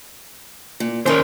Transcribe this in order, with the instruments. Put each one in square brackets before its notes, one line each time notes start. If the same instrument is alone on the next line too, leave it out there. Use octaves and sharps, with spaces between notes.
[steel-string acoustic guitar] A#2
[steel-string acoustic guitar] D#3 C#4 [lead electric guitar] A#4 C5